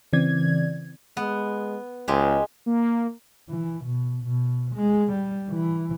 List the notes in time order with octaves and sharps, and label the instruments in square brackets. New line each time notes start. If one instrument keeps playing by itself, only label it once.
[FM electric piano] C#3 E3 C4 D5 G#6
[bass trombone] G#3 [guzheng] B3
[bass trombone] C#2 [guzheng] G#3 G4
[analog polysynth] A#3
[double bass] E3
B2
B2
G#3
G3
E3